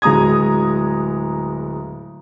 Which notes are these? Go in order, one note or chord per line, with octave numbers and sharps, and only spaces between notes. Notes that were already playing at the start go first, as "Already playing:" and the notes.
D1 G#3 A#5 D#6 G#6